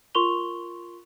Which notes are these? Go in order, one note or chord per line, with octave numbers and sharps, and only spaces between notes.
F4 A#4 C6 C#6 F7 G7